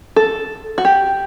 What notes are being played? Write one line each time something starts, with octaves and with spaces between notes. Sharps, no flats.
A4
F#4
G4